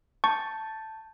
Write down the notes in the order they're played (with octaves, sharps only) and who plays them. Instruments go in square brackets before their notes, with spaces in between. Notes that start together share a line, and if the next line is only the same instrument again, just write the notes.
[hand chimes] A5 G6 A6 [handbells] C#6